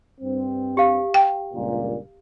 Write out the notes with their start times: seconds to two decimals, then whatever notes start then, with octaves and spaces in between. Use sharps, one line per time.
0.21 G2 C4
0.77 G4 F5
1.14 G5
1.53 C#2 G2 A#2